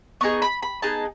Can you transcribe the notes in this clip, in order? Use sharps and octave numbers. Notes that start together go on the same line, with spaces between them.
B3 D#4 G#4 C#6
B5
B5
B3 D#4 G#4 A5